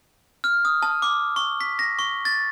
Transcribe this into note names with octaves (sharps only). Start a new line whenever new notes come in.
F6
D#6
A5
D6
C#6
B6
A#6
C#6
A6